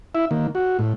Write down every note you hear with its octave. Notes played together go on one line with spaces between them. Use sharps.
E4 E5
D#3 A#3
F#4
A2